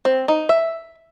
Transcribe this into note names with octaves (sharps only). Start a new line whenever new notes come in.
C4
D#4
E5